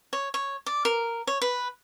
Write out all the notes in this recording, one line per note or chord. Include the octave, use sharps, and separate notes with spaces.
C#5
C#5
D5
A#4
C#5
B4